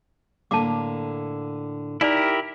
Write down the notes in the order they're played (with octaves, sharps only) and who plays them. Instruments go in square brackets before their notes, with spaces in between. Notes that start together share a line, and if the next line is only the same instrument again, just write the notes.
[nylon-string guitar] A2 D3 A#3 [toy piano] A5 D6
[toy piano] D#4 D5 [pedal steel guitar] E4 G4 A#4